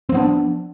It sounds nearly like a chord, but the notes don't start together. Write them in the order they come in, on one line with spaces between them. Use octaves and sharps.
C4 F3 B3 D4